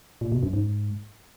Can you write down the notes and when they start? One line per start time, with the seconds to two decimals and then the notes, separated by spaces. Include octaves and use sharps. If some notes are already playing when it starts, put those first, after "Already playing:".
0.21 A#2
0.32 B2
0.43 F#2
0.53 G#2